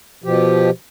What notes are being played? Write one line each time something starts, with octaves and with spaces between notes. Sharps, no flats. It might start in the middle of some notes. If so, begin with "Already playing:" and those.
B2 F3 G4